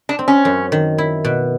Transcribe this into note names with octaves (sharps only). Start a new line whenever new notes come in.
D4
C4
C#4
F#2
D#3
E4
B2